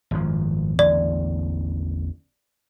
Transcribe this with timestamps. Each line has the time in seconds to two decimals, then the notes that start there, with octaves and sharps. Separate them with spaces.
0.11 G#1 F#2 F3
0.79 A1 E2 D3 D5